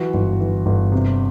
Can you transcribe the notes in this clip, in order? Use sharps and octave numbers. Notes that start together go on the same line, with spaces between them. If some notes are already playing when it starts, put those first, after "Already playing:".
Already playing: E3 F#3 F#4
G1
E3
G1
C3